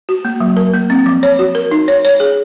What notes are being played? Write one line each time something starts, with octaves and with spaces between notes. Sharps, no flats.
F#4
A#3
F#3
A#4
A#3
C4
F3
C#5
F#4
A#4
D#4
C#5
C#5
G#4